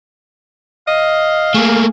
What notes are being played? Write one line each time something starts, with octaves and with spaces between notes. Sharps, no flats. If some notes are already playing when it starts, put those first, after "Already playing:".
D#5 F5
A3 A#3 G#4